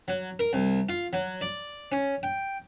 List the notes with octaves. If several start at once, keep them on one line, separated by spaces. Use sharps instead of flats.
F#3
A#4
C2
F4
F#3
D5
C#4
G5